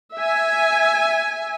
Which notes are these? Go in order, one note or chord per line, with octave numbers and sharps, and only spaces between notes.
E5 G#5